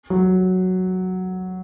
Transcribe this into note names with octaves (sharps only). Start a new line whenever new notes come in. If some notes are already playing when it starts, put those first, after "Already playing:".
F#3